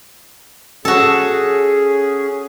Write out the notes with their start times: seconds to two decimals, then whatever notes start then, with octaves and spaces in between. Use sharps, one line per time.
0.85 C#4 F#4 G#4 A4